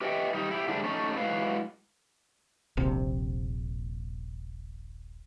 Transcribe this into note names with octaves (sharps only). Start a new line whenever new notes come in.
G4 B4 C#5 D#5 E5 G5
G3 D#4
E4 G4
G#2 D3 G3 A3 D4
A3 C#4 D#4
F#3 G#3 E4 B4 F5
D#1 A#1 C3